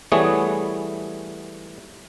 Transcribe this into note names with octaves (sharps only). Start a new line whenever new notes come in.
E3 G3 A3 B3 G#4 C#5